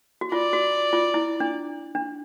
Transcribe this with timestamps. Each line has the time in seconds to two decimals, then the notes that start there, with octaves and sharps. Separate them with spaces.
0.21 F#4
0.32 F4 D5
0.53 F#4
0.93 F4
1.14 E4
1.40 D4
1.95 D4